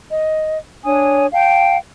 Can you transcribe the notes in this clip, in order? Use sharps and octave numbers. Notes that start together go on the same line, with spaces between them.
D#5
D4 C#5 G#5 D#6
F5 G5 A5